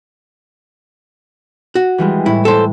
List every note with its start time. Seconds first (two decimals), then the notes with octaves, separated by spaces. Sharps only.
1.75 F#4
1.98 E3 G3 G#3
2.26 A2 E4
2.45 A4 C5